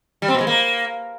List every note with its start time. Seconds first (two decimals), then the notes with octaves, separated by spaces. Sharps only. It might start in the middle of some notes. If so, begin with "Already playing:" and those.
0.22 G3
0.28 C4
0.34 B2
0.41 G#3
0.47 A#3